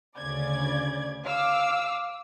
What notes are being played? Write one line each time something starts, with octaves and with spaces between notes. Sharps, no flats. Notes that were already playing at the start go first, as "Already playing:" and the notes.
D2 C#3 D5 G#6
F5 D6 E6